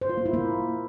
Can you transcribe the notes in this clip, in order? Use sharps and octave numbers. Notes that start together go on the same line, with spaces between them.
C5
F4
A#3
E4
A#3